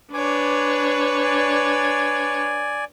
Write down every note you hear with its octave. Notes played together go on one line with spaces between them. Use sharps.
D4 B4 C#5 G#5 D6
D5 G#5